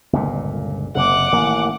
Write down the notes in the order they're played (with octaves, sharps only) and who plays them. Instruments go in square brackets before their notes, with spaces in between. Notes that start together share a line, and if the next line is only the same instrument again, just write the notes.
[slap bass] G1 C#2 A#2
[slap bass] F#1 C3 [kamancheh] F#5 D6
[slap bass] A1 D#3 A#3